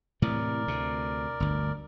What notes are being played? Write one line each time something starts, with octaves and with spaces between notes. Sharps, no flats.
A2 C3 E3 A#4 D5
D2 C3
G1 D2